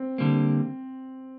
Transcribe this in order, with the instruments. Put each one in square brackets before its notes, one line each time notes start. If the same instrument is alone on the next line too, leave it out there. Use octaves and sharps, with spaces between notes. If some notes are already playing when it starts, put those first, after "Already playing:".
Already playing: [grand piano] C4
[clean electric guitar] D3 G3 A#3